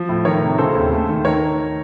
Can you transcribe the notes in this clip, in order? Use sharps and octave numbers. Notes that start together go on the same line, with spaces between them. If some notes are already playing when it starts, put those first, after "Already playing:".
Already playing: F3
A2
D#3 A#4 C#5
C3
C#3 A4 C5
D#2
A3
D#3
D#3 A#4 C#5